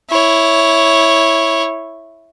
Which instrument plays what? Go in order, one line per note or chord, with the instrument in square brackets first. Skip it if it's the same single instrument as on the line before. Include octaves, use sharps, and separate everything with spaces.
[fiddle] E4 C#5